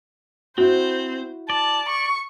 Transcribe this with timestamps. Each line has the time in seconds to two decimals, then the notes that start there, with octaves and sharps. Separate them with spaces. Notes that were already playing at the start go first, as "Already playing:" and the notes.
0.58 C4 E4 F#4 C5
1.50 D5 A5
1.89 C#6